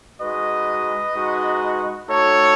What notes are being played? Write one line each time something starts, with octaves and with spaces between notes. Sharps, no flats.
G#3 D#4 F#4 B4 D#5
G#3 D#4 F#4
A3 D#4 F#4 A4 C#5